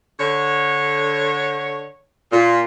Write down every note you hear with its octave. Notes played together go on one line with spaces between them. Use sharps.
D3 C#5
A#2